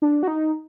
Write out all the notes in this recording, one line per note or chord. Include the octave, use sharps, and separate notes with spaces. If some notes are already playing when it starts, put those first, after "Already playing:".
D4
F#4
D#4